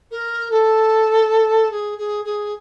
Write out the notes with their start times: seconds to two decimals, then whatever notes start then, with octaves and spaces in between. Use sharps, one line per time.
0.11 A#4
0.51 A4
1.71 G#4
1.98 G#4
2.24 G#4